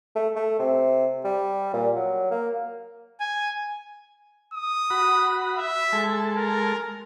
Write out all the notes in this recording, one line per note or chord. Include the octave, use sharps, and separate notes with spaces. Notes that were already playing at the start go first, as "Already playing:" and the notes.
A3
A3
C3
G3
A#2
F#3
A#3
G#5
D#6
F#4 B5
E5
G#3 A4
A#4